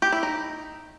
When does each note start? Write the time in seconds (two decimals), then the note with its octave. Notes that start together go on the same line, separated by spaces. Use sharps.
0.02 G4
0.12 E4
0.23 D#4